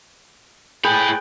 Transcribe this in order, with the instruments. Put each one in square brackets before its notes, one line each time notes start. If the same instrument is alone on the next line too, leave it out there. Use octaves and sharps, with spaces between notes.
[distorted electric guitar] A2 B5 [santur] G#4 B4 G5